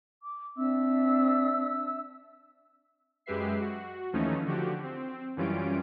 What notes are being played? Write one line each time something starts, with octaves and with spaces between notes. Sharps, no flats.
D6
C4 D4 E5 E6
F#2 G#3 G4 B4 E5 C7
F#4
D#2 E3 F3 A3 C#4 D#4
D3 F3 F#4 G4
C4
F#2 E3 G3 C#4 F4 D7